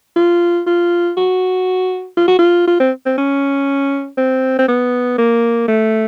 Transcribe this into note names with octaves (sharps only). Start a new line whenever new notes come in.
F4
F4
F#4
F4
F#4
F4
F4
C4
C4
C#4
C4
C4
B3
A#3
A3